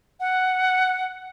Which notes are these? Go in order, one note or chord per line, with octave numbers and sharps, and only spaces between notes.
F#5